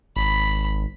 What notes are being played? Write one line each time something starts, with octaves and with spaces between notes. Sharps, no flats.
G#1 B5